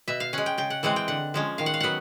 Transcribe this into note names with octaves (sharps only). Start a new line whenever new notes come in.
B2 E5
F5
G#3 C#4 F#5
G5
C#3 G5
F#5
E3 G#3 C4 F#5
G5
D3 F#5
F3 G#3 C#4
D#3 F5
F#5
F5
F#3 B3 F#5